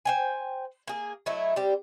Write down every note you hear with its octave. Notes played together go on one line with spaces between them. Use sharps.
C5 G5 G#5
A#3 G#4
F#3 A3 D#4 E4
G3 C4 G4